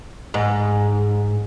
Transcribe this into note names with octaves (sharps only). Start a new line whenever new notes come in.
G#2